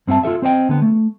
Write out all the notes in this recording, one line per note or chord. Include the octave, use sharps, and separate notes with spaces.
G2 C4 C#4 F#4 E5 A5
F4 G#4 A4 E5
C4 C5 D#5 G5
D3 B3
A3